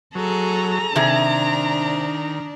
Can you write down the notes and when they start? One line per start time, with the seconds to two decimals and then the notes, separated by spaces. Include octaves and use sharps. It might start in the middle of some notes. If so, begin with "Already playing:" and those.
0.15 F#3 G#4 A4 A#5
0.96 C3 D#3 D4 G#4